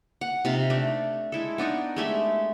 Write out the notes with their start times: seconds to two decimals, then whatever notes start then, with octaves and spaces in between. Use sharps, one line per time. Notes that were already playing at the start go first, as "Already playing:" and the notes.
0.21 F#5
0.45 C3 D#4 F4 F5
0.70 A3 D4
1.32 G#3 E4 A4
1.58 B3 D4 D#4 C#6
1.96 G#3 A3 G4 E5